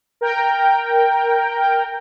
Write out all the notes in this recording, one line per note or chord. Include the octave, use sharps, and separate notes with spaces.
A#4 G5